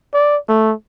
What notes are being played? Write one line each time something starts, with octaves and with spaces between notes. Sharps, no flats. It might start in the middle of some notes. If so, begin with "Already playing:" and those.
D5
A3